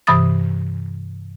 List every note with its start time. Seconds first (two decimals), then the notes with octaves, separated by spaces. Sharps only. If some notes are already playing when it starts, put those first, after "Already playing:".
0.07 G2 C3 E3 B5 D#6 A6